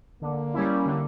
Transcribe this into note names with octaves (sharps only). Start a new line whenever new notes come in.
D3 A#3
G3 C#4 E4
D3